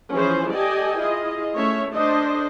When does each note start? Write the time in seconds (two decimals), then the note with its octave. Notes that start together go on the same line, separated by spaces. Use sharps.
0.12 E3 F3 C#4 G#4 B4 C5
0.50 G4 A4 D5 D#5 G5 G#5
0.99 E4 F4 G#4 D#5
1.55 A3 C#4 C#5 E5
1.93 D4 A4 C5 D#5